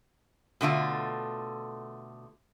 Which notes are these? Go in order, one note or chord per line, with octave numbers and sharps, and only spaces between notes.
B2 D3 A3 F4